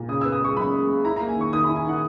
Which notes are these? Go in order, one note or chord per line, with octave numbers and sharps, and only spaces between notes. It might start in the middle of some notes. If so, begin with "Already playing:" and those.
Already playing: A#2
C#3 D#6
B3 E6
D#6
G#3 C#6
F#2 B5
G#3
G#3
E4 A#5
A#3 A#5
G#5
D#3 C#6
D#3 D#6
E4 B5
G#5
D#3 F#5